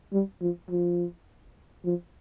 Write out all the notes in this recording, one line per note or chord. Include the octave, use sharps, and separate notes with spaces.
G3
F3
F3
F3